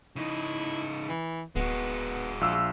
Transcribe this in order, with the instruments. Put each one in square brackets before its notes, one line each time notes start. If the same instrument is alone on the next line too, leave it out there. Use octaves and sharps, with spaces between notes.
[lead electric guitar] C#3 D#4 [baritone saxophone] E4
[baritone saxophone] E3
[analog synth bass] D1 [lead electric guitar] G#3 F#4 [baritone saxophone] B3
[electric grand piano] A#1 E6 [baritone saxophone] F4